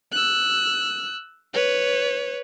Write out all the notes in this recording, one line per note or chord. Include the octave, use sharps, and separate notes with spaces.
E6 F#6
B4 C#5